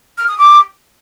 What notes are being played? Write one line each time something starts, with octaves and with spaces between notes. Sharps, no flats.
F6
D#6
D6